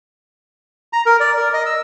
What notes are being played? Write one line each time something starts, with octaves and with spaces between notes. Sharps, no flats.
A#5
A#4
D5
A#4
D#5
E6